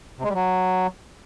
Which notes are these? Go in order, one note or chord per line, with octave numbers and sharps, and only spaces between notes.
C3
G#3
G3
F#3